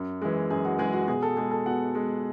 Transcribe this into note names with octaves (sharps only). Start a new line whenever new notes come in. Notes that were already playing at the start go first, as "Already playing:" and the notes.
Already playing: F#2
E3 G#3
F#2 G#4
F#4
E3 G#3 G#4
F#4
B2 G#4
A4
G#3 G#4
A4
B2 F#5
G#3